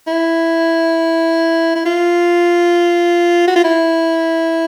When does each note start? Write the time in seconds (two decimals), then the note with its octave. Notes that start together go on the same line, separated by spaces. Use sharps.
0.07 E4
1.76 E4
1.86 F4
3.48 F#4
3.56 F4
3.64 E4